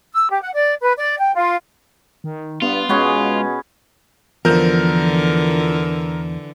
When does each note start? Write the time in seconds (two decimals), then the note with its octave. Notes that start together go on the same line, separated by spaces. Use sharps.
0.13 E6
0.30 G4
0.42 F#5
0.55 D5
0.81 B4
0.98 D5
1.19 G5
1.34 F4
2.24 D#3
2.62 G2 B3 F4
2.89 B2 G#3 B3 C#4 G#4
4.45 E2 D3 E3 F3 A#4 G6